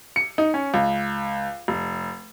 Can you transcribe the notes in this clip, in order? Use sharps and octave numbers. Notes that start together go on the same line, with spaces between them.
C#7
D#4
C#4
C#2
F1